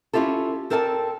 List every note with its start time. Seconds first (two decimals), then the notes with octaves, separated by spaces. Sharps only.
0.13 C#4 E4 F4 G4 A4
0.70 C4 A4 A#4 D5 G#5 A5